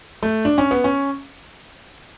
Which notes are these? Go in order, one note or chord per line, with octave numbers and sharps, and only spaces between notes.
A3
D4
C#4
B3
C#4